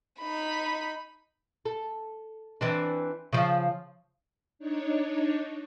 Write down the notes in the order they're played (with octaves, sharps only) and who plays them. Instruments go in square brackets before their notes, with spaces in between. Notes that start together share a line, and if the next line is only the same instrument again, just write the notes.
[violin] D#4 B5
[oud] A4
E3 C4 D4
C#3 F3
[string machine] D4 D#4 C#5